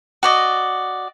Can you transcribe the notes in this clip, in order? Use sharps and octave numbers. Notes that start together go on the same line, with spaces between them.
F#4 D5 D#5